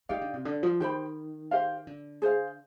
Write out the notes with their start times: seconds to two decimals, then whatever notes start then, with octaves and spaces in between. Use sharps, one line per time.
0.09 D#3 D#4 G4 D5 F5
0.21 D3
0.33 C3
0.45 D3
0.63 F3
0.80 D#3 G4 C5 G5 B5
1.51 G4 C5 F5
1.87 D3
2.22 G#4 C5 F5